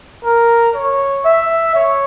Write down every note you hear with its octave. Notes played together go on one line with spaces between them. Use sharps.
A#4
C#5
E5
C#5